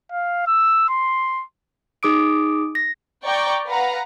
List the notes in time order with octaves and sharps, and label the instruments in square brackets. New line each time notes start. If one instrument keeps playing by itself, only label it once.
[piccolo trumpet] F5
E6
C6
[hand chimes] D#4 G#4 D6 D#6 D7
A#6
[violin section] D5 G5 A#5 C#6
B4 F5 F#5 A#5